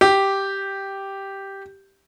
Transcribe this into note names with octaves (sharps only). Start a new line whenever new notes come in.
G4